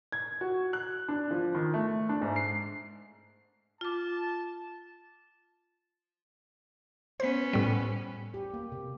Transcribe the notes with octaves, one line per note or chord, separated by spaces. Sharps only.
G#6
F#4
F#6
D4
F3
D#3
A3
D4
G#2
C7
F4 A5 D6
B3 C#4 C5 B6
A2 G3
G4
A#3
C3